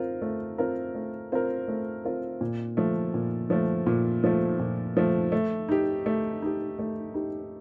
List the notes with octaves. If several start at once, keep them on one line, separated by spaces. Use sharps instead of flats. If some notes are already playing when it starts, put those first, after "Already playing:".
Already playing: C4 F4 A#4
A3
C4 F4 A#4
A3
C4 F4 A#4
A3
C4 F4 A#4
A#2
F3 A3
A#2
F3 A3
A#2
F3 A3
A#2
F3 A3
A3
D#4 G4
A3
D#4 G4
A3
D#4 G4